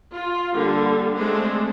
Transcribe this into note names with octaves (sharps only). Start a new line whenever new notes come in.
F4
D3 G3 A#3
G#3 A3 C4 D4